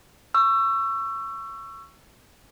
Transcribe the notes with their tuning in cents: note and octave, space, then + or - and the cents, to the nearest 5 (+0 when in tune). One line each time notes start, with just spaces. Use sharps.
C#6 +0 E6 +30